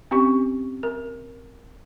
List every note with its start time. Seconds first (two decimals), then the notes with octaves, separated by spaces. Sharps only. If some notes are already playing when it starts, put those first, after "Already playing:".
0.11 C4 C#4 G4 C#6
0.83 A#4